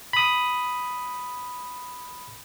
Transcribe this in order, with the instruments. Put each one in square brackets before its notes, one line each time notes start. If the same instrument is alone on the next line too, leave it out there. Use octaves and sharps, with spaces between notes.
[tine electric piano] B5 D#6